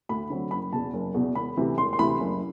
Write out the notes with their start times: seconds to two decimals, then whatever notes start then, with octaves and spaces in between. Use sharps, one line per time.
0.09 D2 B5
0.30 D3 F#3 C4
0.51 F#1 B5
0.73 E2 B2 A5
0.93 F#1
1.14 E2 B2
1.35 E1 B5
1.57 D2 C3 E3
1.78 E1 C6
1.93 C6
1.99 D2 C3 E3 B5
2.20 F#1